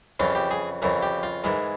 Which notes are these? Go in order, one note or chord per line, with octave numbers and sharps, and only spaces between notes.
F2 C#3 E3 F4
G4
G#4
F2 C#3 E3 A#4
G4
F4
G#2 E3 G#3 A#4